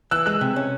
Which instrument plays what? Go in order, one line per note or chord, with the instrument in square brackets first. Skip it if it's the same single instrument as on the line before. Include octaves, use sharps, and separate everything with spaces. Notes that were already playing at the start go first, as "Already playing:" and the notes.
[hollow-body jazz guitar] E3 [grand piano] E6 F#6
[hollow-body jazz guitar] G#3 [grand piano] E6 F#6
[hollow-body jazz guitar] C3
C#4